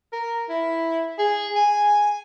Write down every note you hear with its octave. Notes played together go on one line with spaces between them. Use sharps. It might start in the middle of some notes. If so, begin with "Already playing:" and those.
A#4
E4
G#4
G#5